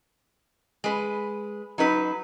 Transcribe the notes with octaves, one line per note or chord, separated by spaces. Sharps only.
G#3 B4
F#3 D#4 B4